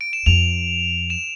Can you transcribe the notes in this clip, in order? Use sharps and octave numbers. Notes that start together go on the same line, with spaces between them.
D7
E7
F2 F7
E7